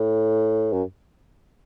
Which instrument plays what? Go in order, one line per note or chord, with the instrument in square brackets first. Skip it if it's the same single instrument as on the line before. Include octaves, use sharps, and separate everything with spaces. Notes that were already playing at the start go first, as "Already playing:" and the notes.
Already playing: [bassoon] A2
F#2